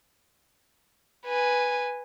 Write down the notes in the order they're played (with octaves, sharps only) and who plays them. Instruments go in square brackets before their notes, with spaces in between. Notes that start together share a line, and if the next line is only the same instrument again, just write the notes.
[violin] B4 G#5